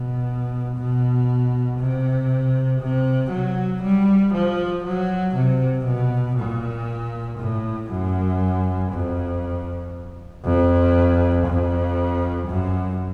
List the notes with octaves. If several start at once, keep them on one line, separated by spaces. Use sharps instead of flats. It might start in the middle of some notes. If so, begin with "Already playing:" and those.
Already playing: B2
B2
C3
C3
F#3
G3
F3
F#3
C3
B2
A#2
A2
F#2
F2
F2
F2
F#2